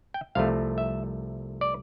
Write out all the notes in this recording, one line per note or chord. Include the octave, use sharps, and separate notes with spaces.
G5
C2 C3 F3 A3 F5
E5
D5